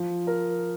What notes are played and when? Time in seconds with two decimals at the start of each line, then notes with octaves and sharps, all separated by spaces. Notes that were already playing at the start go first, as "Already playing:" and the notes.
Already playing: F3
0.27 A#4